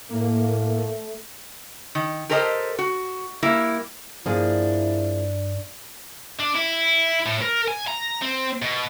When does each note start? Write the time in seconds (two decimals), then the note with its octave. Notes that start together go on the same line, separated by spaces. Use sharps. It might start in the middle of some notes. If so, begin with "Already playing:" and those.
0.10 A2 A3 A#3
1.95 D#3
2.29 G4 A4 A#4 C5 C#5 D#5
2.79 F#4
3.43 G3 A#3 E4
4.26 G2 F3 A#3 D4 E4 G#4
6.40 D4
6.56 E4
7.26 A2
7.42 A#4
7.68 G#5
7.88 A#5
8.22 C4
8.62 B2